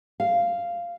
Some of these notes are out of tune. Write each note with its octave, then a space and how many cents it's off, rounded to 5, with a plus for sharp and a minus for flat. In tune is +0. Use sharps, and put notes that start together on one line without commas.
F5 -10